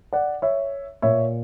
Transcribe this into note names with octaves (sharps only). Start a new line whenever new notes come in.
D5 F#5
C#5 E5
A#2 C#5 E5